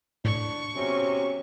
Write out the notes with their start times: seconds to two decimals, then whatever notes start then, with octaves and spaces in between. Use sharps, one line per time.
0.25 A2 D4 C#6
0.75 E2 C3 F#3 C#4